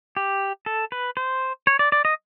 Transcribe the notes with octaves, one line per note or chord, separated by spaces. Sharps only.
G4
A4
B4
C5
C#5
D5
D5
D#5